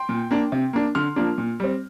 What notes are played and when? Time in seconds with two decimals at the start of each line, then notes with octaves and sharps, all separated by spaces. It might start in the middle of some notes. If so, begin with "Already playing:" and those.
Already playing: G5 C6
0.09 A#2
0.31 A#3 D4
0.52 C3
0.73 A#3 D4
0.95 D3 C6 F6
1.16 F3 A#3 D4
1.38 A#2
1.60 G3 C4